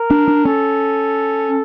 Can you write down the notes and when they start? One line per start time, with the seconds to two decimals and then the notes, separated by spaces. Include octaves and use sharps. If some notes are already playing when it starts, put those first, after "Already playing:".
Already playing: A#4
0.11 D4
0.28 D4
0.45 C#4 A4